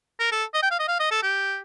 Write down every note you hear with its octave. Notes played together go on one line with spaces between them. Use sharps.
A#4
A4
D#5
G5
F5
D#5
F5
D#5
A4
G4